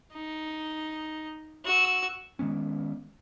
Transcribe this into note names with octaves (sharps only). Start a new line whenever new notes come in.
D#4
F#4 E6
D#3 G#3 B3 C#4